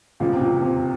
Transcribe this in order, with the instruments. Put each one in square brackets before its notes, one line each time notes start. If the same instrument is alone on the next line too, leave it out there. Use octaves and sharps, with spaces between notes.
[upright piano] C#2 C#3 F3 [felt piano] A#2
[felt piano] C3
A#2
C3